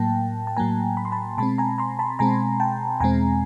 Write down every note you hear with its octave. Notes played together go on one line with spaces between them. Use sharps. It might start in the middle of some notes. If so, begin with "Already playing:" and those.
Already playing: A2 F#3 A#3 G5 A5
A5
A2 F#3 A#3 G#5 A#5
B5
C6
A5 B5
B2 G#3 C4 A5 B5
G#5 A#5
A#5 C6
A5 B5
B2 G#3 C4 G#5 A#5
G5 A5
E2 B2 G#3 C4 G#5 A#5